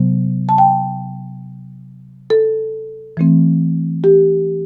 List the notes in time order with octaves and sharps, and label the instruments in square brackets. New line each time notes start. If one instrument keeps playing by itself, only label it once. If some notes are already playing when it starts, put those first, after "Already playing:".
Already playing: [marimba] C3 F#3 B3
A5
G5
A4
E3 A3 C4
G4